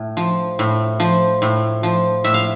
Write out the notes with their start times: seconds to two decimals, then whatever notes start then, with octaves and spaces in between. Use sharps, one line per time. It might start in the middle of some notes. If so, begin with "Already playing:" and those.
Already playing: A2
0.17 F3
0.59 A2
1.00 F3
1.42 A2
1.83 F3
2.24 A2 E5
2.34 F5